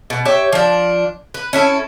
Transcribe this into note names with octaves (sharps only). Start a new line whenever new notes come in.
B2
G4 C#5 E5
F3 D4
B4
C#4 E4 A4